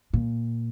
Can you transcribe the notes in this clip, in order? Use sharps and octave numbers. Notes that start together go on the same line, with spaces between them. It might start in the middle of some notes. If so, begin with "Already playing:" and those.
A#2